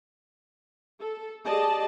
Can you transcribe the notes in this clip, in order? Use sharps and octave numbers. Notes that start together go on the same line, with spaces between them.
A4
G4 G#4 D5 D#5 A5